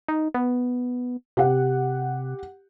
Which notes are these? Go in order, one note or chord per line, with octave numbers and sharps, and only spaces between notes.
D#4
B3
C3 G4 F#5